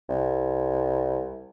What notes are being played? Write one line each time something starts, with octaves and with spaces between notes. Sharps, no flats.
C2